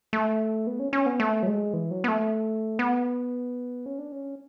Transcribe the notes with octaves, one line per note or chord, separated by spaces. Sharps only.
A3
B3
C#4
C#4
B3
A3
F#3
G#3
E3
F#3
B3
A3
B3
C#4
D4
C#4